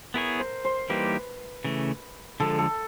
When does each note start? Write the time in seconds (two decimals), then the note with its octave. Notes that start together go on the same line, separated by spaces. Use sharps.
0.14 B3 E4 G#4 A#4 C#5
0.40 C5
0.65 C5
0.90 E3 G3 A#3 D#4 G4 B4
1.64 C#3 E3 A3
2.40 D3 F3 G#3 A4
2.59 A4